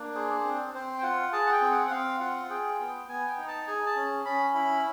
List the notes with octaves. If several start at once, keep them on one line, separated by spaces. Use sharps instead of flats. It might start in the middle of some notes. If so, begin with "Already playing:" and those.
Already playing: A#3 D4
G#4 C5
C4
C4 C5
G5
F4 F#5
G#4 A5
F#5
G5
C4
F#5
F#5
C4 F5
F4 F#5
G#4 G5
B3
B3 G#5
G5
D#4
A5
G#4 G#5
A5
C#4
C#4 B5
E4 B5